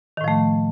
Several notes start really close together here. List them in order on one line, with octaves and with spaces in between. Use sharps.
D#3 A2 F3 A3